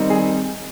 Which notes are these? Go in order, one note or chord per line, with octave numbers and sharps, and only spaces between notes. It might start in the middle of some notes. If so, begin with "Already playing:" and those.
Already playing: D#3 G3 C4 D#4
G#4